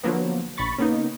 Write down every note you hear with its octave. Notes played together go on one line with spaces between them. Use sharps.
D3 F3 F#3 A#3 B3
A#1 B5 C#6 A6
C#3 A#3 B3 D#4